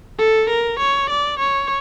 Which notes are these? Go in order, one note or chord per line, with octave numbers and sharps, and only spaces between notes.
A4
A#4
C#5
D5
C#5